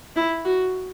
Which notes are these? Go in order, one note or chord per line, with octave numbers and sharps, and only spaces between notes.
E4
F#4